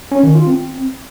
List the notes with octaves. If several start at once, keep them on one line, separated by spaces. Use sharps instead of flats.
C#4
D#3
F4
C4